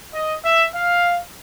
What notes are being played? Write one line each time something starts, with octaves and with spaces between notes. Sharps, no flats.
D#5
E5
F5